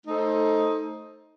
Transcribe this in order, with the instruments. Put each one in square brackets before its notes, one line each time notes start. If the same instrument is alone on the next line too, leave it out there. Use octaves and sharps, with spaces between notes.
[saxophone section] A3 D#4 A4 C5